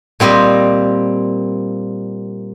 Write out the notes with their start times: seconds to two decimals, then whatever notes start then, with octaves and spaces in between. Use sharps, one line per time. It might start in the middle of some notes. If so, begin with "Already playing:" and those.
0.20 A#2 G3 C4 G4 D#5